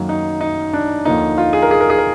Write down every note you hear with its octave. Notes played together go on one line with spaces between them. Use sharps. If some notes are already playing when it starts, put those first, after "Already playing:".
Already playing: F#2 D#3 F#3 A#3
D#4
D#4
D4
D#2 D3 F3 A#3 D#4
F4
G#4
A#4
G#4
A#4
G#4
A#4